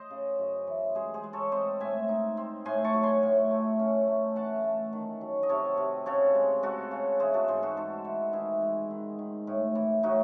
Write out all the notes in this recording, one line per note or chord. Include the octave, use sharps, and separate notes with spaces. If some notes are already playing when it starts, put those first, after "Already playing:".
Already playing: C5 D#5
C#3
F#2
E3
G#3 G#4 C5
G#4 C5
G#3
A4 C#5
C4 C5 D#5
A2 E5 G#5
D#4
C4
A2 G#5 C6
A5 C#6
F#3
G#5 C6
A2
A3
C#4
A3
E3 F#5 A5
A3
D#3
F#3
D#5
C3 A4 C#5
C3
C#3 A4 C#5
G#3
G#3 F#4 A4
C#3
E3 G#4 C5
F#4 A4
G#2 G#4 C5
F#4 A4
G#2 F#4 A4
E3
D#3 E4 G#4
G#3
D#3
D#3
A2
E3
A2 D#4 F#4